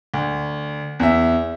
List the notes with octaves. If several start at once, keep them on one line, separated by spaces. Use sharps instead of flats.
D2
E2 E5